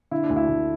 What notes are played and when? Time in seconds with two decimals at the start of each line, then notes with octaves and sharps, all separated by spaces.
0.11 D3 E4
0.24 D4
0.30 D2
0.36 E4
0.49 D2